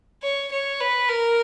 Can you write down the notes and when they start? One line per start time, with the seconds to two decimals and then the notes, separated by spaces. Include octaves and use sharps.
0.23 C#5
0.52 C#5
0.80 B4
1.09 A#4